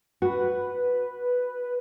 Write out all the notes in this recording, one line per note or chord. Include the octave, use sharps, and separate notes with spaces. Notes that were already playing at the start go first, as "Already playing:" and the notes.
F#4 B4